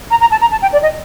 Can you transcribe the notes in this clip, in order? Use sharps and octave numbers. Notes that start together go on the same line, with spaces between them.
A#5
A#5
A5
A#5
A5
G5
D5
D#5